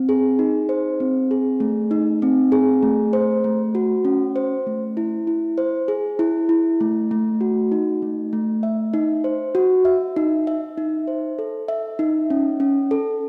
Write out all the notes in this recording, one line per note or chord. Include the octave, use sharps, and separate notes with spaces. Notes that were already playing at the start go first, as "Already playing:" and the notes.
Already playing: C4
G#4
D#4
C5
C4
G#4
A3
D#4
C4
G#4
A3
C5
A3
F#4
C#4
C5
A3
E4
E4
C5
G#4
E4
E4
A3
A3
F#4
D#4
A3
A3
E5
D#4
C5
F#4
E5
D#4
E5
D#4
C5
A4
E5
D#4
C#4
C#4
A4